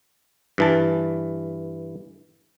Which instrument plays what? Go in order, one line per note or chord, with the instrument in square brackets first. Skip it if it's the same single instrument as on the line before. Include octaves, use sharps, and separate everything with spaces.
[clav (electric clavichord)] G2 E3 A5